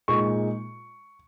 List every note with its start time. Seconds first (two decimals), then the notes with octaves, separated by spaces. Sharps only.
0.08 A#2 G#3 D#4 C#6